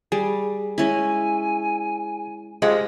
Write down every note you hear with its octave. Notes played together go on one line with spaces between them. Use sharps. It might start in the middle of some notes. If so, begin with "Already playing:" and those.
G3 G#4
G#3 C#4 E4 G#5
G#3 F4 G4 C5